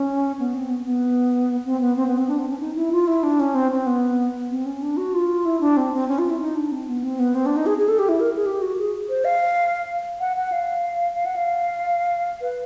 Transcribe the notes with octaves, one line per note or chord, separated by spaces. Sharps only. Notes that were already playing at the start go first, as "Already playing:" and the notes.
Already playing: C#4
B3
C4
B3
B3
C4
B3
C4
B3
C4
D4
C4
C#4
D#4
E4
F4
E4
D4
C#4
C4
C4
B3
C4
C#4
D4
F#4
F4
E4
D4
C4
C4
C#4
F4
E4
D#4
D4
C4
B3
C4
B3
C4
D4
D#4
G#4
G#4
A4
G4
E4
A#4
G#4
G4
F#4
G#4
C5
F5
F#5
F#5
F5
F5
F#5
F5
B4